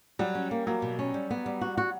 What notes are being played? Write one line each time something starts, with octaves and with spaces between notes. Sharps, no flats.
F#3 G3
C#4
A#3
F#3 A#3
B2
C#4
G3
B3
G3
F#4
F#4